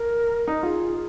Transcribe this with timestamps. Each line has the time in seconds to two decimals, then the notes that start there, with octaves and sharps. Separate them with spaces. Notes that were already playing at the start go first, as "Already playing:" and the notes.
Already playing: A#4
0.48 D#4
0.63 F4 G#4